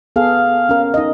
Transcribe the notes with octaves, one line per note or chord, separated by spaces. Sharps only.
B3 G#4 A4 F5
C#4 A#4
D#4 D#5